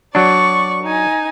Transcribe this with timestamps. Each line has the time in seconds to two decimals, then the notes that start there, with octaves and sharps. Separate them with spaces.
0.15 F#3 D4 D5 C#6
0.83 D#4 G#5